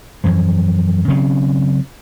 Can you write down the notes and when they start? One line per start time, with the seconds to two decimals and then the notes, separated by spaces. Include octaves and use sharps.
0.24 F#2 E3 F3
1.08 C#3 F#3 C4 C#4